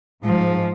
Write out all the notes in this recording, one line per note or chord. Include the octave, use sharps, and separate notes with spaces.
G#2 F3